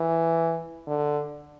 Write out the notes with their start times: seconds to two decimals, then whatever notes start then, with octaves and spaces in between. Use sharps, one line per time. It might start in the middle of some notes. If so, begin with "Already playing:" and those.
Already playing: E3
0.87 D3